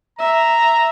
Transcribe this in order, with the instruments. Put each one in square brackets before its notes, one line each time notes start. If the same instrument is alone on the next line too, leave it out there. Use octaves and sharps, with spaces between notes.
[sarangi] E5 [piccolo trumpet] A#5